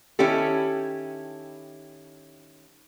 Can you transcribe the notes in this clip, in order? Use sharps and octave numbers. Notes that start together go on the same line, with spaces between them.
D#3 C#4 E4 G4 A4